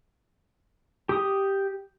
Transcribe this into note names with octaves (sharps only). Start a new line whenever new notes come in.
G4 D#6